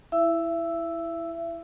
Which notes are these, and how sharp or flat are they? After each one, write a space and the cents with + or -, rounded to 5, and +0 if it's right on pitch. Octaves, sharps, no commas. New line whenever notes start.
E4 +0 E5 +30 E6 +0